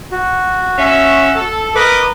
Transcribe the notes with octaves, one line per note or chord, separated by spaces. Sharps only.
F#4
C#4 E5
A4
A#4 B4 D#5 D6